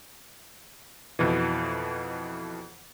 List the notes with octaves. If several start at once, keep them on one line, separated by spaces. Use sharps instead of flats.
F2 B2 E3